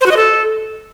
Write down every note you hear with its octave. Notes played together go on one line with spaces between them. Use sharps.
C5
F#4
D#5
A4